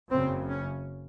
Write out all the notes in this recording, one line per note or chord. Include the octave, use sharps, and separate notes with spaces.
F#1 F#2 C#3 C4
C#4